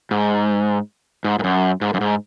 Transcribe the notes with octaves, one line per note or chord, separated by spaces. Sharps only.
G#2
G#2
G#2
F#2
G#2
F#2
G#2